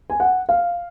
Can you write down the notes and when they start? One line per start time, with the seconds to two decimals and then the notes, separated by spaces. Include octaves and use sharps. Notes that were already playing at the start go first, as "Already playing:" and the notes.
0.10 G#5
0.20 F#5
0.49 F5